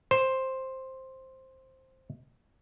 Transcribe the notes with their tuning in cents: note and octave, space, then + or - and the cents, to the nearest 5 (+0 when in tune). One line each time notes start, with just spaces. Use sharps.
C5 +5